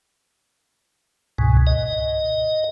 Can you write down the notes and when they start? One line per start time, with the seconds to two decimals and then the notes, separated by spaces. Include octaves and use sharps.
1.38 C#2 G#2 B2
1.67 D#5